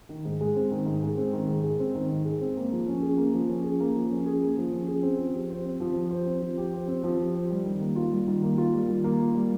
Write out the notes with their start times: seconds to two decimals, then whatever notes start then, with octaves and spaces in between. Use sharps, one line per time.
0.09 D#3
0.25 G#2
0.41 G#3
0.56 C4
0.72 D#3
0.86 G#2
1.02 G#3
1.17 C4
1.33 D#3
1.48 G#2
1.64 G#3
1.80 C4
1.95 D#3
2.10 G#2
2.25 G#3
2.41 C4
2.57 A#3
2.72 F3
2.88 C#4
3.02 G#4
3.17 A#3
3.34 F3
3.49 C#4
3.64 G#4
3.80 A#3
3.95 F3
4.11 C#4
4.26 G#4
4.42 A#3
4.57 F3
4.72 C#4
4.88 G#4
5.03 C4
5.18 F3
5.34 G4
5.50 C5
5.65 C4
5.80 F3
5.96 G4
6.11 C5
6.26 C4
6.42 F3
6.57 G4
6.73 C5
6.88 C4
7.03 F3
7.19 G4
7.34 C5
7.50 G3
7.65 D#3
7.81 A#3
7.96 F4
8.11 G3
8.27 D#3
8.43 A#3
8.58 F4
8.73 G3
8.89 D#3
9.04 A#3
9.20 F4
9.34 G3